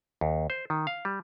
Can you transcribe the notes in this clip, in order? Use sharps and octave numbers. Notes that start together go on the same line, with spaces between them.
D#2
C5
D#3
F5
G3